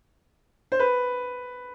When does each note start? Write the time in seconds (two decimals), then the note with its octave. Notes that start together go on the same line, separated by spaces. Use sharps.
0.72 C5
0.79 B4